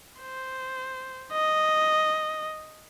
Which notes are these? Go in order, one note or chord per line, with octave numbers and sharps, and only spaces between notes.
C5
D#5